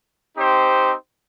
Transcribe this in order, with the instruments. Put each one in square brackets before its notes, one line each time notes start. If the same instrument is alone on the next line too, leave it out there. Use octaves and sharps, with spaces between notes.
[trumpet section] C4 D#4 G4 C5